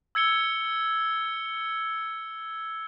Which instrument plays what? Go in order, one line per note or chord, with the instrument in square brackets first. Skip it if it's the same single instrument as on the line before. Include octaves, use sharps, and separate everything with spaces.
[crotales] E6 G#6 C#7 G7